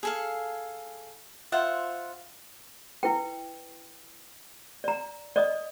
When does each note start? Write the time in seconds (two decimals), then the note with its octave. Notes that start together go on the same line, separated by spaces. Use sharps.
0.03 G#4 A4 F5
1.52 F4 C5 E5 F#5
3.03 E4 B4 G5
4.84 D5 A#5
5.36 D5 D#5 D#6